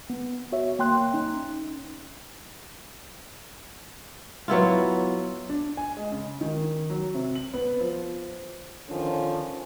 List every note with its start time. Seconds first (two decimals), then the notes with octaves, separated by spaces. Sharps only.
0.10 B3
0.52 F#4 C#5 E5
0.79 A#3 G5 C6 F#6
1.14 C#4 D#4
4.48 F#3 B3 E4 F4
5.49 D4
5.77 G#5
5.97 G#3
6.12 C#3
6.41 D#3
6.90 F#3
7.14 C3
7.35 F#7
7.54 B3
7.80 F3
8.88 D3 D#3 F3 C#4